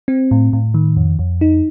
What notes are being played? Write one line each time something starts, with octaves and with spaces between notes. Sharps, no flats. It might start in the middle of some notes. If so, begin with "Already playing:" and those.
C4
A2
A2
D#3
F2
F2
D#4